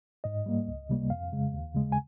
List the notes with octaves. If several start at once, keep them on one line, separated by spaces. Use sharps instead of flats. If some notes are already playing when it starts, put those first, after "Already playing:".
G#2 D#5
G3 A#3
C#2
C3 G3 A#3
F2 F5
C#3 G#3
D#2
C#3 G#3
G#5